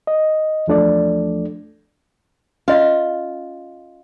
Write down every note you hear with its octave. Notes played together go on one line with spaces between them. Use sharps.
D#5
E2 F3 A3 D4 A4 D5
C#4 F4 D#5